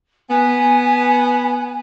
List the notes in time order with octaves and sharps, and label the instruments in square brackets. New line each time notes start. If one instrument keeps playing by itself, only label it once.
[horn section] B3 [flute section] G#5